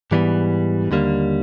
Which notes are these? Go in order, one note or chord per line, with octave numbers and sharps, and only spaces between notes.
G#2 E3 G3 B3
D#2 D3 G3 A#3